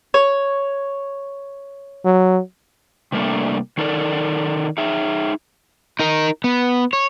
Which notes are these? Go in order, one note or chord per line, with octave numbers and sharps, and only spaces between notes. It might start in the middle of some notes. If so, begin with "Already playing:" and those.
C#5
F#3
C3 G3 A3 A#3 D4
D#3 D#4 A4 A#4 D5
D#4 G#4 E5
D#4 A#4
B3
C#5